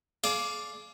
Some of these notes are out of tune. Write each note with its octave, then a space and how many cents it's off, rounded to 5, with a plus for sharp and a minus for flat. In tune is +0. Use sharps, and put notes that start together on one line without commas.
G#4 +35 D5 +0 F5 +0